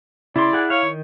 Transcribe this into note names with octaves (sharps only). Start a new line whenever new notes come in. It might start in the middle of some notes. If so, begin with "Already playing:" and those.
C#3 E4 D5 C6
G#4 F#5 G#5
C#5 F5
D#3